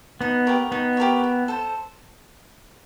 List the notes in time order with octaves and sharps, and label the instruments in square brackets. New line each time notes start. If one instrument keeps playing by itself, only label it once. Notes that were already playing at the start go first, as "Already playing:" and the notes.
[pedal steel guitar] B3 [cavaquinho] D#4
[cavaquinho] G4 A#4 C#5
[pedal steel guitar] B3 [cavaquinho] D#4
[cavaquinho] G4 A#4 C#5
E4
A4 C5